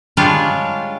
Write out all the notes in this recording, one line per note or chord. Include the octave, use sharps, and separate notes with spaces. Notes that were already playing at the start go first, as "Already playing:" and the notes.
G3 G#3 D4 F4 C#5 F5